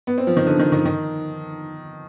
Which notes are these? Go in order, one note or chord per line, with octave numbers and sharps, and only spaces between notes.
B3
C4
F3
D#3
D3
D#3
D#3
D#3